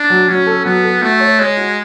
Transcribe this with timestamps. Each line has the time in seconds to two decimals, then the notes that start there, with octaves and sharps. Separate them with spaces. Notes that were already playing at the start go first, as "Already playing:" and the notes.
Already playing: D4
0.10 F#3
0.28 F#3 C#4
0.47 A4
0.65 F#3 B3
0.84 A4
1.02 A3 F#4
1.20 C#5
1.38 G#3 C#5
1.57 F#4